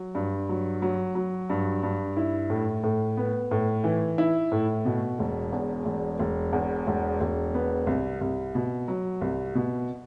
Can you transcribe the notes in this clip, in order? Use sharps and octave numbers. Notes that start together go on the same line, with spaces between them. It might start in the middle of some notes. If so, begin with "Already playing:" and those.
Already playing: F#3
G2
F#3
F#3
F#3
G2
G2
E4
A2
A2
B3
A2
E3
E4
A2
B2
E1
E2
E1
E1
E2
E1
E1
B3
C2
C2
B2
F#3
C2
B2